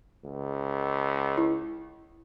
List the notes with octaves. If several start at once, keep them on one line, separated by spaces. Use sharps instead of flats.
C#2
E4